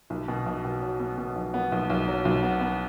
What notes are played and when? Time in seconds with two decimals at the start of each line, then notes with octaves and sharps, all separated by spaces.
0.10 B1
0.28 B2
0.46 B1
0.65 B2
0.82 F#3
0.99 B3
1.18 B2
1.36 B1
1.54 B3
1.72 B1
1.90 B1
2.08 F#3
2.25 B1
2.43 B3
2.61 B3